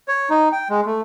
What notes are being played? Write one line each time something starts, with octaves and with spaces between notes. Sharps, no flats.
C#5
D#4
G5
G#3
A3